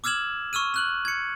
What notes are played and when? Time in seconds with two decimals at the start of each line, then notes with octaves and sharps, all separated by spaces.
0.04 D6 E6 F6 G#6 E7 F#7
0.53 C#6 E6 F6 D#7
0.74 F6 F#6 F#7
1.05 G#6 C#7